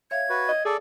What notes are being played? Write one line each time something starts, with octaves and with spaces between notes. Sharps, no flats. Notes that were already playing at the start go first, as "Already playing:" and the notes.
C#5 E5 F5 G#6
F#4 B4
D#5
G#4 A4 D5